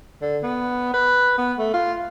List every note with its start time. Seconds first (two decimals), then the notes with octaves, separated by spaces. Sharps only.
0.22 D3
0.43 B3
0.93 B4
1.38 B3
1.58 A3
1.74 F4